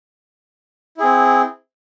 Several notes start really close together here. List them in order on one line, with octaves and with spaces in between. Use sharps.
E4 G#4 C4